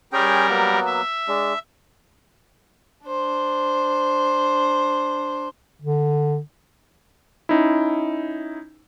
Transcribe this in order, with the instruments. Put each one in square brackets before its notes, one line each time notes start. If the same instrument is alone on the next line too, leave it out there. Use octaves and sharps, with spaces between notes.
[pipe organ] G3 A#4 [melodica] C#4 G#4 G5
[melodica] F#3 A#3 B3
[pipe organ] E5
[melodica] G#3 D4
[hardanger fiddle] D4 C5
[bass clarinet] D3
[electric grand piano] C#4 D#4 E4